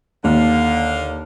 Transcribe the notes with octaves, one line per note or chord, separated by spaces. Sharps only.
D#2 D3 F5